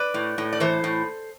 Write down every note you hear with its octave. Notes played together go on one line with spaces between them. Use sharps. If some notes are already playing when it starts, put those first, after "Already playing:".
Already playing: B4 D5
A2
A2
D5
E3 A4 C5
A2